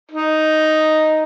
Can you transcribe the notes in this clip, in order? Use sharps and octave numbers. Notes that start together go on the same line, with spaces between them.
D#4